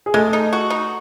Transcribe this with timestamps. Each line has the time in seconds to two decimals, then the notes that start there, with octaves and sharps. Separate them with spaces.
0.06 G#4
0.14 G#3 A3 A4
0.33 D#4
0.53 F#4
0.70 D#4